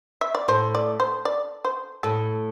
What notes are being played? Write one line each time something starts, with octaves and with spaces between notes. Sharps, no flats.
E5
D5
A2 C5
D5
C5
D5
C5
A2 A4